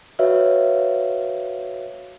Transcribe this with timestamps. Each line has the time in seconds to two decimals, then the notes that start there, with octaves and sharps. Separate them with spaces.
0.19 F#4 B4 C#5 E5 F5